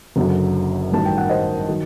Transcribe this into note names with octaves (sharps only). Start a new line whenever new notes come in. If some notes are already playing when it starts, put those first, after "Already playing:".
F#1 F#2 D3 F#3
A1 G2 D#3 F#3 A5
G5
F#5
C5 D#5
D#3 F#3